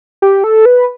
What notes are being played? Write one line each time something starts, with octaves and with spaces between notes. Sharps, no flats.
G4
A4
B4